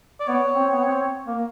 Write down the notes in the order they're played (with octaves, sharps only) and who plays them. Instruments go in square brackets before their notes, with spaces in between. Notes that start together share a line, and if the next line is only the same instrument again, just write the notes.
[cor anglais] D5
[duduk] B3 [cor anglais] C#5
[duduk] C4
B3
C4
A#3